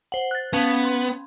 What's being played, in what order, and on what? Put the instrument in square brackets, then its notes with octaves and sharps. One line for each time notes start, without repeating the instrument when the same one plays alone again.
[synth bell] C5 F#5
F#6 A6
[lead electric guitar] B3 [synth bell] C#4 F5 A5
[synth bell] B5 C6